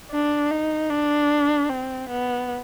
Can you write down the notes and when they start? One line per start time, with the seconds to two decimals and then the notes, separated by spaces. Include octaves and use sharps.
0.11 D4
0.51 D#4
0.90 D4
1.69 C4
2.09 B3